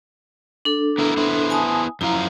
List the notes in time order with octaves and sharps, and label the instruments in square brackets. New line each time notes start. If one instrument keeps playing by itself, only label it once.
[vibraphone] D4 A4
[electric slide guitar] B3 E4 A#4
B3 E4 C5
[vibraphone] G#5 A5 D#6
[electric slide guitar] F#2 F3 F5 [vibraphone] E4 A#5